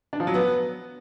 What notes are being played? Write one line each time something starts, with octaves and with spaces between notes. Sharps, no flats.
D4
F3
F#3
B3